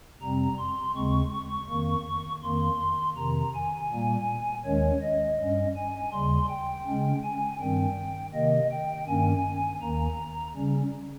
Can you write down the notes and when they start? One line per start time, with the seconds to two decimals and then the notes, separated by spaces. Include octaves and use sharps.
0.22 F2 C3 G3 C4 A#5
0.59 C6
0.95 D#2 C#3 G#3 C4 C#6
1.32 C#6
1.69 F2 D#3 A#3
2.43 F2 D#3 A#3 C6
3.17 F2 C3 D#3 A#5
3.54 G#5
3.91 A#2 G3 A#3
4.65 D#2 D#3 G#3 C#4 C#5
5.02 D#5
5.38 G2 G3 C#4
5.76 G#5
6.12 D#2 C#3 G3 C6
6.49 G5
6.86 C#3 G#3 C#4
7.23 G#5
7.60 G2 D#3 G3 C4 G5
8.34 C3 D#3 A#3 D#5
8.71 G5
9.08 G2 D#3 A#3 C#4 G#5
9.81 D#2 D#3 A#3 A#5
10.55 C#3 G3 C#4